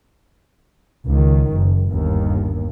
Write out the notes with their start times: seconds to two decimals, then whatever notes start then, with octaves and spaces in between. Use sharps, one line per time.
1.07 C#2 D#3
1.54 F#1
1.91 G1 D#2